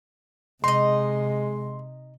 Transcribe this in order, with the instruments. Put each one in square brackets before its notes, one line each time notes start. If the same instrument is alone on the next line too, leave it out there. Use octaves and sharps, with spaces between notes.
[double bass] C3 [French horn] G#3 [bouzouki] D#4 D#5 [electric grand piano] C6